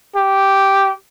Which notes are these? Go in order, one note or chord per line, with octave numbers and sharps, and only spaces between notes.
G4